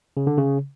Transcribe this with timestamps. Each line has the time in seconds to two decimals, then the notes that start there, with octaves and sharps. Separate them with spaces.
0.17 C#3
0.27 D3
0.38 C#3